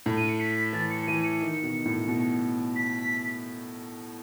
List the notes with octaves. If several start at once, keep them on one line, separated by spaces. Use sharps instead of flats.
A2
D#7
C#7
B6
E3 A6
C#7
E3 D#7
C#7
D#3
B2
A2
B2
B6